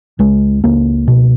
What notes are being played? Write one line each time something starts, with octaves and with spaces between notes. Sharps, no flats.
C#2 G#3
C#2 A#3
B2